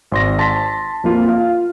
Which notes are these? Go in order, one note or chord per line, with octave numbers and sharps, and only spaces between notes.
G#1 C6 A#6
A5 C6 B6
F2 A#3 F4
F4 F5